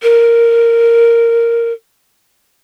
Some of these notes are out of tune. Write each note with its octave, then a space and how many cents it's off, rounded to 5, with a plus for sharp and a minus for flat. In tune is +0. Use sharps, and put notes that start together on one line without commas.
A#4 -5